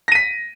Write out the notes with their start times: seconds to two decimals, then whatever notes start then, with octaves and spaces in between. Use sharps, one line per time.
0.08 A#6
0.12 D#7
0.15 B6